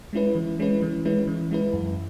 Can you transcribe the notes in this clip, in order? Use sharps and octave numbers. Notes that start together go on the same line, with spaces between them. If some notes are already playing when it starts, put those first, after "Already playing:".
G#3 C#4 E4 B4
E3
G#3 C#4 E4 B4
E3
G#3 C#4 E4 B4
E3
G#3 C#4 E4 B4
F#2